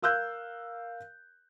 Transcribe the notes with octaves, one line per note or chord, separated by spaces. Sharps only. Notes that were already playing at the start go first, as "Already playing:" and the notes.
A#4 F5 E6 F#6 G6